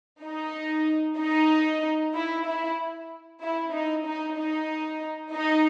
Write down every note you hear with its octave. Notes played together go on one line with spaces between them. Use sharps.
D#4
D#4
E4
E4
E4
D#4
D#4
D#4
D#4